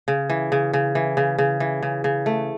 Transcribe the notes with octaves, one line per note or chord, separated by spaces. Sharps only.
C#3
E3
C#3
C#3
E3
C#3
C#3
E3
C#3
C#3
A3